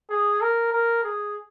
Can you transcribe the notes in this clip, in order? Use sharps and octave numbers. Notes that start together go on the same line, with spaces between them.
G#4
A#4
A#4
G#4